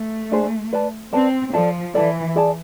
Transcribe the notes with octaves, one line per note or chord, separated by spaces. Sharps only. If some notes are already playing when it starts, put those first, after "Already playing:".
Already playing: A3
D4 G#4 C5
B4 D5 A5
C4 B4 D5 A5
F3 A4 D5 A5
E3 A4 D5 A5
G#4 D5 A5